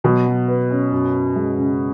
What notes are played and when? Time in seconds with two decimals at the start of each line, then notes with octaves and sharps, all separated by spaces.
0.04 B2 F#3
0.26 F#3
0.48 B4
0.70 C#4
0.92 F#2
1.14 C#4
1.36 G#3
1.58 C#3